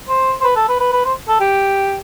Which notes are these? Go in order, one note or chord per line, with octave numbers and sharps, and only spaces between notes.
C5
C5
B4
A4
B4
B4
B4
C5
A4
G4